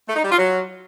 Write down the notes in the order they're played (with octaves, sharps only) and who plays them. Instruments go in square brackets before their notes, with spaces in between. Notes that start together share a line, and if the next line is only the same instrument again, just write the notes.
[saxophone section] A3
D#4
G3
F4
F#3